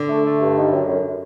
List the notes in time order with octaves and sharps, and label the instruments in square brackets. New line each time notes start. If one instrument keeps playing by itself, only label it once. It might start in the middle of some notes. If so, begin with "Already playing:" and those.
Already playing: [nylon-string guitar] D3
[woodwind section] A3
A3
G2
D#3
F#2
F#2